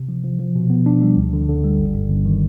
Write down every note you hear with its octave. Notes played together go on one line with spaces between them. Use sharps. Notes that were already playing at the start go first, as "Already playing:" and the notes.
Already playing: C3
F3
F3
F3
B2
B3
D4
G3
D2
D3
D3
G3
G1
G2
G1
D#3